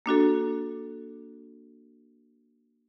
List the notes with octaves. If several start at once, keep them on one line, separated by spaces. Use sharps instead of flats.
A#3 D4 F#4 A4